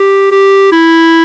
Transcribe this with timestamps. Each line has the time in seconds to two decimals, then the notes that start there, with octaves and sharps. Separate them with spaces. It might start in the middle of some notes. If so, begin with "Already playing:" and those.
Already playing: G4
0.32 G4
0.72 E4